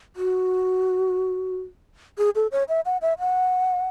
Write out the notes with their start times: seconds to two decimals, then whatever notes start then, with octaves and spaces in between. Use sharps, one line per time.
0.16 F#4
2.18 G#4
2.35 A4
2.52 C#5
2.69 E5
2.86 F#5
3.02 E5
3.19 F#5